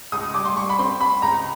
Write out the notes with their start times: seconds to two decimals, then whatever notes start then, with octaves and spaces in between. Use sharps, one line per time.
0.12 C#2 D#6
0.34 G3 D6
0.45 C6
0.56 G3 C#6
0.69 B5
0.79 C4 C6
1.01 G3 B5
1.22 C#2 A#5